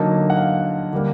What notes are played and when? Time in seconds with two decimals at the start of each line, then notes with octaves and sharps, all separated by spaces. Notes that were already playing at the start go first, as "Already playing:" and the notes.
Already playing: D3 F#3 A#3 D#4 A5
0.30 F#5
0.37 F5
0.93 D3 G3 A#3